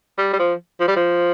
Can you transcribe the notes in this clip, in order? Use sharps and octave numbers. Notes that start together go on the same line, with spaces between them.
G3
G3
F3
F3
G3
F3